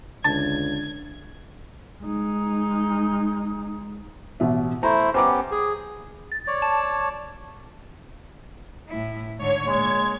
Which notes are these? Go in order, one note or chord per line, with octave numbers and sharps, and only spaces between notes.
C#2 D3 A5 G#6
G#3 D#4
A1 B2 E5
A3 E4 C5 A#5
B3 C#4 G4 C5 A#5 D6
G#4
A6
C#5 D5
A5
A2 E4
G#2 D3 C#5
A#2 G#3 G#6